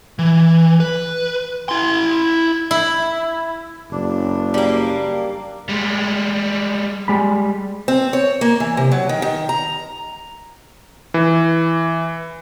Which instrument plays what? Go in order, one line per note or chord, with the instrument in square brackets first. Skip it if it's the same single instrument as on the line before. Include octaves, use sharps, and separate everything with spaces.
[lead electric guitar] E3
B4
E4 C6
[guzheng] E4
[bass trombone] F#1 [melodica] D4
[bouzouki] G3 A#3
[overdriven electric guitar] G3 G#3
[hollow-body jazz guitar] G3 G#3 B5
[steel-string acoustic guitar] C4
C#5
A#3
E3
C3
F#3
D#3
D#3
A#5
[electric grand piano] E3